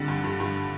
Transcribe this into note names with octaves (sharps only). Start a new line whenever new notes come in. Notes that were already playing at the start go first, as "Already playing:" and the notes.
Already playing: F2 D3 G3
G2
G2
G2